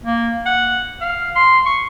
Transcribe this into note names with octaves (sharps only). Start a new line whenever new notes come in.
A#3
F#5
F5
C6
C#6